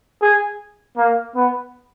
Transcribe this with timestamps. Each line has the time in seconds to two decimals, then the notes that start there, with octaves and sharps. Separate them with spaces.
0.22 G#4
0.97 A#3
1.36 B3